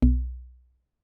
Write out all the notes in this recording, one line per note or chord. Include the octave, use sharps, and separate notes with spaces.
B1